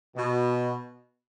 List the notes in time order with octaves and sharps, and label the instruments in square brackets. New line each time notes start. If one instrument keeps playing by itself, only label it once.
[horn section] B2